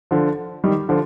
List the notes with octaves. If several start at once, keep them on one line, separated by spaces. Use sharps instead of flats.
D3 F3
D#3 G3
D3 F3